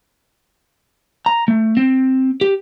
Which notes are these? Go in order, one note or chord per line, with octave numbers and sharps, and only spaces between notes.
A#5
A3
C4
G4